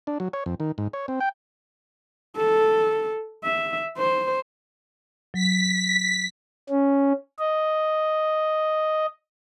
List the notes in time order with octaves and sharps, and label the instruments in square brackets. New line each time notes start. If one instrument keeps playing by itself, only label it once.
[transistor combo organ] D4
F#3
C#5
F2
D#3
G#2
C#5
C4
G5
[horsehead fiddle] A4
E5
C5
[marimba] F#3 [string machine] B6
[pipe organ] C#4
D#5